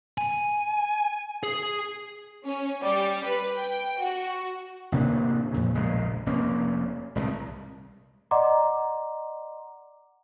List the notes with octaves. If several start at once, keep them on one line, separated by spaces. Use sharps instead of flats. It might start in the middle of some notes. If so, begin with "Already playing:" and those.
G#5
G#4
C#4
G3
B4
G5
F#4
A1 C3 A#3 D4
F2 A#2 C#3
E1 A#1 C#3 G#3
F1 A#3 C#4
E1 C2
D5 D#5 F#5 A#5 C6 D6